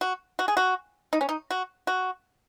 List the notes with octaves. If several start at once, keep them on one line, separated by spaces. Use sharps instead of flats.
F#4
F#4
G#4
F#4
D#4
C#4
D#4
F#4
F#4